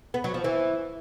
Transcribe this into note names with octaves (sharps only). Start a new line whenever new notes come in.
B3
F#3
F3
E3